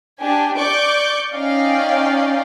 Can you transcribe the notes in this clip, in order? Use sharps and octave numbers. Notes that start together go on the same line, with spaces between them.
D4 G4 G#5
D5 C#6 D6 G6 D7
C#4 D#4 D5 D#5 F5 G5